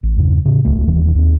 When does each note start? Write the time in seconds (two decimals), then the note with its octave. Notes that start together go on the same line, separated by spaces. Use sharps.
0.03 A1
0.17 E2 G2 C#3
0.45 A2 C#3
0.65 D1 C2 A3
0.87 E1 D#2 D#3 E3
1.15 D#2 C4